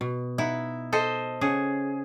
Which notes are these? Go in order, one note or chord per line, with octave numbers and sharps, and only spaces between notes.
B2
D#4 E4 F#5
A4 C5 D#5
C#3 G#4 F#5